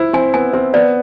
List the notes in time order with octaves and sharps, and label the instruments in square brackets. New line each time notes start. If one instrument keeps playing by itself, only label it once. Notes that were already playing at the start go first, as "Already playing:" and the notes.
Already playing: [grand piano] E4 [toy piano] C5
[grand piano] C4 [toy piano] G#5
[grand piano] B3 [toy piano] G#5
[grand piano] C4 [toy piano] C5
[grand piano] B3 [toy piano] D5